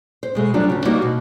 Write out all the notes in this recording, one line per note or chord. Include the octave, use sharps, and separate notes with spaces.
C5
B2 G#3 A3
F#3 G3 D4 F4
D2 C#3
G3 A#3 B3 D#4 F#4 G4
B2